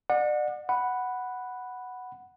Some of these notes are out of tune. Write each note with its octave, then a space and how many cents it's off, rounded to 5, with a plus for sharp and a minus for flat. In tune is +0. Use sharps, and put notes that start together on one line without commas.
D5 +35 F#5 -25
F#5 +0 B5 +0